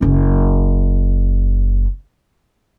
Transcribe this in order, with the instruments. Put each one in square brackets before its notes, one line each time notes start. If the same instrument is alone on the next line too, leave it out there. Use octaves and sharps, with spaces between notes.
[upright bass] F#1 C#4